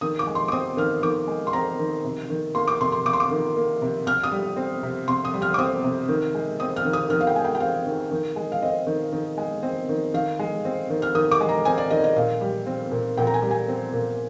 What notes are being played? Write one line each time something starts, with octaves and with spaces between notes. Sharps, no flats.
D#3 D#6
D6
G#3
C6
D6
C4 D#6
D#3 F6
D#3 D6
G#3
C6
C4 A#5
D#3
C3
D#3
A#3 C6
D6
C3 C6
C6
C3 D6
C6
D6
D#3
A#3
C3
C3 F6
D#6
G3
C4
C3
C3 C6
D#6
G3
F6
D6
C4 D#6
C3
D#3
G#3
C4 D#6
F6
D#3
D#6
D#3 F6
F5
G5
G#3 G#5
G5
G5
C4 F5
D#3
D#3
G#3
F5
C4 D#5
D#3
D#3
G#3
C4
D#3
D#3 F5
G#3
C4
D#3
F6
D#3 D#6
D6
G#3
A#5
C4 G#5
D5
D#3 D#5
D#5
A#2 F5
G3
C4
A#2
A#2 G5
A#5
G#5
G3
G#5
C4
A#2